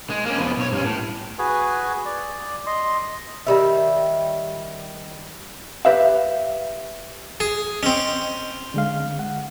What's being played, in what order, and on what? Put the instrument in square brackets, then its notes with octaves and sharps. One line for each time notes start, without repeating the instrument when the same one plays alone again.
[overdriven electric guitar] G#3
A#3 C#4
F2 B3
B1 C#5
G2 C#4
A2
[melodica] F#4 G#4 B4 G#5
D5
D#5 C6
[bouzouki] D#3 G3 E5
[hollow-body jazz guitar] G4 B4 E5 F5
[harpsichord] G#4
[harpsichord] C4 C#4 [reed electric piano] D#5
[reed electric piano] D3 G#3 F5
F#5